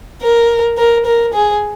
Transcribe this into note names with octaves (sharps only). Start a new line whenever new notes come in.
A#4
A#4
A#4
G#4